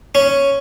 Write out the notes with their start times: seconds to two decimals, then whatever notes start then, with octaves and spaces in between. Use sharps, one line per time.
0.15 C#4